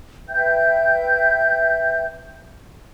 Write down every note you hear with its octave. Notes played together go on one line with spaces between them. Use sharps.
B4 E5 G5 G6